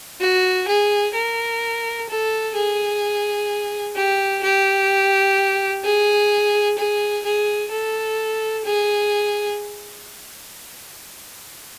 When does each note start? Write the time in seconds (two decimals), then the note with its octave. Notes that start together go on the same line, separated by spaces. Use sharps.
0.21 F#4
0.68 G#4
1.15 A#4
2.09 A4
2.55 G#4
3.96 G4
4.43 G4
5.84 G#4
6.78 G#4
7.25 G#4
7.71 A4
8.64 G#4